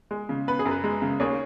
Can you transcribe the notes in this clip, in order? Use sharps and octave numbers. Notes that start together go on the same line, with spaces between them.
G#3
C#3
B3 B4
G#4
F#2
B4
G#3
C#3
D#2 G#4 C#5